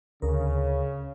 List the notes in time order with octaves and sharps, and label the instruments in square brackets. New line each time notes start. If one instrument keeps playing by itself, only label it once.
[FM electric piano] D2 A#4 [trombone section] C#3